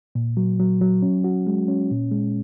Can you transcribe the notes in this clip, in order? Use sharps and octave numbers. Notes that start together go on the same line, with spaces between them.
A#2
F#3
F#3
F#3
C#4
F#4
G#3
C#4
A#2
G#3